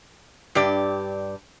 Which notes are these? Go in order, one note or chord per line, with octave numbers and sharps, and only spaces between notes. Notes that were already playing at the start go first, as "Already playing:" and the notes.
G2 G4 D5